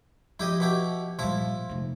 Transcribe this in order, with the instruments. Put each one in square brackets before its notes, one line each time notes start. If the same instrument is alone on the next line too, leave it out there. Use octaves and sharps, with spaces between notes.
[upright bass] F3 [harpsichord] E4 G4 D#5
[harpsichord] B2 E4 G4
[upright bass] A#2 G3 [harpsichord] F3 E4
[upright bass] F1 A3